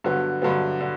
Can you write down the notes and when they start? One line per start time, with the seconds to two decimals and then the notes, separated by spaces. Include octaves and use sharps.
0.04 G2 D3 F#3 B3
0.42 G2 D3 F#3 B3
0.81 D3